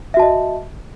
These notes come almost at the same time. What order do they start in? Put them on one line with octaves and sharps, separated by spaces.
E5 F#4 A5 D#5